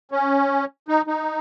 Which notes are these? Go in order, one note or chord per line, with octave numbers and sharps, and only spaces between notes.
C#4
D#4
D#4